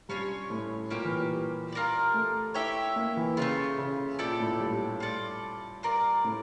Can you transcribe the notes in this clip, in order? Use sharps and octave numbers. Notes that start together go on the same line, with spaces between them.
G2 C#4 F4 C#5
A2
A#2 A#3 C#4 G4
E3
G3
F4 A#4 D5
A3
E4 G4 C#5 E5
A#3
E3
C#3 A3 D4 F4
C#3
A#2 E4 A4 D5 G5
A2
G2
F4 A4 D5
F4 A#4 D5
A2